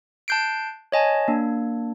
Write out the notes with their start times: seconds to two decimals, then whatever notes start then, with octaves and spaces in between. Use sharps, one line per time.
0.28 A5 F#6 G6 C7 D7
0.92 C#5 D#5 G#5 A5
1.28 A#3 D4